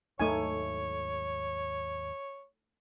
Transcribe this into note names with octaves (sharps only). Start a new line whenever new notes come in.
D#2 G#2 F#3 A3 D#4 C#5 G#5